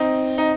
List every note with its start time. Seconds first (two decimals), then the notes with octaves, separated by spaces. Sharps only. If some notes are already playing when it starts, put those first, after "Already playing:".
Already playing: C4 D#4
0.38 D#4